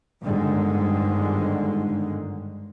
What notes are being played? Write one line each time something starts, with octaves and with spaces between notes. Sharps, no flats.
G1 G#2 D3 D#3 G#3